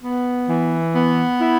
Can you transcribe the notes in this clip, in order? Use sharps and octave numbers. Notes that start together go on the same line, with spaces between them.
B3
E3
B3
E4